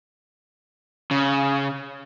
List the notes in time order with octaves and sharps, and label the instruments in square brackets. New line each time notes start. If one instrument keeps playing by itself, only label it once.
[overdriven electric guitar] C#3